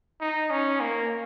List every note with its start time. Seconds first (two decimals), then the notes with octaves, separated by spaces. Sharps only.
0.21 D#4
0.51 C#4
0.81 A#3